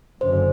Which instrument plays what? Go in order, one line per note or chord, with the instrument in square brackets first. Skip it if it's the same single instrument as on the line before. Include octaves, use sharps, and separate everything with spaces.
[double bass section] F#1 F#2 D3 [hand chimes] C5